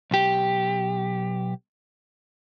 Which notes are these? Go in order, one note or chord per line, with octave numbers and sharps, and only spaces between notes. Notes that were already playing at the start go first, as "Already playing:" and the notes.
B1 G4